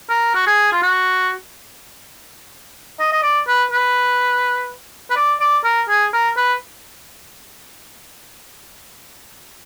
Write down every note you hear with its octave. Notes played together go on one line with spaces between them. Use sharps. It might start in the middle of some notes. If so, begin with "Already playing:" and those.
A#4
F#4
G#4
F4
F#4
D#5
D#5
D5
B4
B4
B4
D5
D5
A#4
G#4
A#4
B4